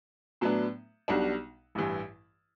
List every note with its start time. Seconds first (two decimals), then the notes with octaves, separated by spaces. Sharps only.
0.41 A2 F#3 B3 D4
1.08 B1 B2 G3 D4 F#4
1.75 A1 G2 E3